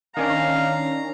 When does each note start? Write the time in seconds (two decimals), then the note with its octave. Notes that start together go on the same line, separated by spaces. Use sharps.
0.17 D#3 C#4 D4 F5 A#5